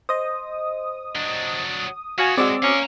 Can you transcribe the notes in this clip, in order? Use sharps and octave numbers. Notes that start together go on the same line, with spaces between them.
C5 D#5 D#6
F#3 D4
B3 F#4 C#5 F5 G#5
G#3 C4 F#4 D5 D6 E6
C#4 F5 A#5